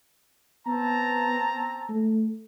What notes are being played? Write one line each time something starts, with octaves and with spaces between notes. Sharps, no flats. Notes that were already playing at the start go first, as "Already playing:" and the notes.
B3 C4 A5 A#5
A3